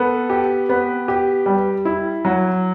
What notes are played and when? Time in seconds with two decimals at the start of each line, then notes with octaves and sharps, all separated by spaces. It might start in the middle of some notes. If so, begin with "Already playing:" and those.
Already playing: B3 A4
0.30 G4
0.69 B3
1.08 G4
1.46 G3
1.85 E4
2.25 F#3